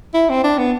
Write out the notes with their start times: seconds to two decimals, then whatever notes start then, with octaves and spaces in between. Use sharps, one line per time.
0.14 E4
0.30 C4
0.44 D4
0.58 B3